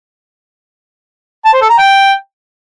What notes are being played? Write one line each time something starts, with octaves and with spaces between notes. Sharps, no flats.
A5
C5
A4
A#5
G5